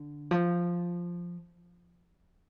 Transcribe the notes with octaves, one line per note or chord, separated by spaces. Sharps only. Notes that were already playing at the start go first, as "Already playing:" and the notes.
Already playing: D3
F3